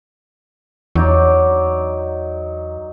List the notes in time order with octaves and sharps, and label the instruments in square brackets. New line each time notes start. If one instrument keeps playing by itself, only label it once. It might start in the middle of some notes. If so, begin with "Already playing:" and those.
[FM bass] E2 [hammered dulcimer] F#3 D#4 D5